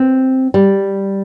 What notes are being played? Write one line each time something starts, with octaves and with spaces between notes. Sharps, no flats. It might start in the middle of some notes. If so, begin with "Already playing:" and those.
Already playing: C4
G3